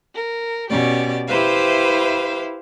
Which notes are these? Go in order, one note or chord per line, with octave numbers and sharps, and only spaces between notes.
A#4
B2 C#4 G4 D5
E4 G4 B4 C5 E5 F5